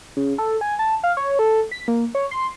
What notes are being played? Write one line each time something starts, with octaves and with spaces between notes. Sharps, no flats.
C#3
A4
G#5
A5
F5
C#5
A4
B6
A#3
C#5
C6